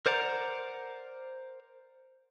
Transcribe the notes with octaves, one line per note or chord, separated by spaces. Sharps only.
A#4 C5 D5 F#5 A#5